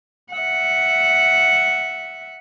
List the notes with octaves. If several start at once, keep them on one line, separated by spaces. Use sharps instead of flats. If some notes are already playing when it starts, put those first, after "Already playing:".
E5 F#5